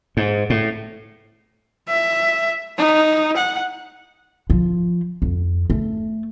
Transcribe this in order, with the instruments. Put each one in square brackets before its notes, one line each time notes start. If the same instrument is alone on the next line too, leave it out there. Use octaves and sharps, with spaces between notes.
[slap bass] G#2
A2
[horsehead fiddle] E5
D#4
F#5
[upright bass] F3
F2
A3